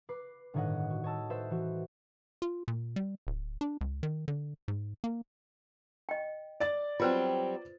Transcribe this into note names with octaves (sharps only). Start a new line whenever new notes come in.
B4 D6 C7
G1 A2 D#3 C#5 D#5 F#5
F#4
C#5 D#5 A5 E6
A4 B4 C5 E5
E3 F#4
F4
A#2
G3
D1
D4
C#2
D#3
D3
G#2
A#3
D#5 G5
D5 A6
F#3 G3 C4 F4 B4 C5